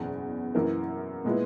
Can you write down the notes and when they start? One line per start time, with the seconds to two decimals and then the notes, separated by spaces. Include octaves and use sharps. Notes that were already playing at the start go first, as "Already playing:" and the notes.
Already playing: F#1 E2 B2
0.55 F#2 E3 A#3
1.25 A#2 G#3 B3 E4